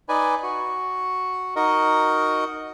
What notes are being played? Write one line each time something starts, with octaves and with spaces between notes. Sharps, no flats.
D#4 B4 D5 G#5
F#4
D#4 F#4 A#4 D#5